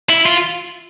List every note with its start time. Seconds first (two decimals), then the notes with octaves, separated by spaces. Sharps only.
0.09 E4
0.26 F4